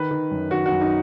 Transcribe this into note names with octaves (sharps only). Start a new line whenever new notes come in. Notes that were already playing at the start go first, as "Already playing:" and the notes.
Already playing: D#3 B4
D#3
F#2
D#3 F#4
F#4
F#2
D#4